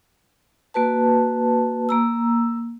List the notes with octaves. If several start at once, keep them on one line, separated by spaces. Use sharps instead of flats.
A#3 F#4 B4 A5
A#3 A#5 E6